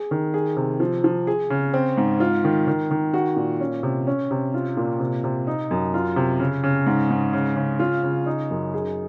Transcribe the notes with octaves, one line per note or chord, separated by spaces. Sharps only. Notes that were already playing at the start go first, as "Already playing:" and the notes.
Already playing: G#4
D#3
G#4
C3
F3
F3
G#4
C#3
C4
G#2
F4
D#3
D#3
D#3
F#4
A#2
C#4
C3
C#4
C3
F4
A#2
C3
C3
D#4
F#2
F4
C3
C#3
C#3
G#2
G#2
C#3
C#3
F4
C#3
D#4
F#2
G#4